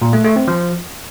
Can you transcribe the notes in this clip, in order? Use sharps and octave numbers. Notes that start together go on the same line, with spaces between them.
A#2
A3
A3
C4
F3